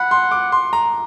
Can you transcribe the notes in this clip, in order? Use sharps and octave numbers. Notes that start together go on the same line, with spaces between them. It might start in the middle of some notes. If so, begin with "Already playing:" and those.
Already playing: F#5 B5
C6
D6
C6
A#5